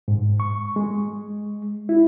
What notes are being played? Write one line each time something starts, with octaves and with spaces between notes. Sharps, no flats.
G#2
C#6
G#3
E4